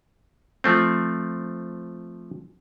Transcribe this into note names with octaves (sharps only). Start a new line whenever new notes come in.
F3 A3 C4